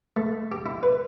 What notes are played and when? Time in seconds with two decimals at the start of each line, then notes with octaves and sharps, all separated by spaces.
0.17 A3
0.52 G4
0.66 E4
0.83 B4